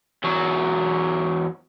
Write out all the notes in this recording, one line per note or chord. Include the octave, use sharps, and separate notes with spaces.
E2 F#3